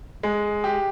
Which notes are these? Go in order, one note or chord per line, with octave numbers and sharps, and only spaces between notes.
G#3
G4